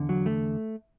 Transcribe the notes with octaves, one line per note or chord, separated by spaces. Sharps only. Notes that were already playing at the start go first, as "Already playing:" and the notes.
Already playing: E2 D3
F#3
A3